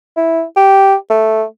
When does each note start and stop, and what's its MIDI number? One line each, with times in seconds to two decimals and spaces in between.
0.17 0.43 64
0.57 0.95 67
1.10 1.44 57